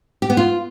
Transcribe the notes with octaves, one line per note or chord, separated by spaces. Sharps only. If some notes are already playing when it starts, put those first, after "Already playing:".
G4
B3
F4